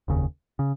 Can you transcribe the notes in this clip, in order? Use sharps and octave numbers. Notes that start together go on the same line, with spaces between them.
F1 D#2 C#3
C#3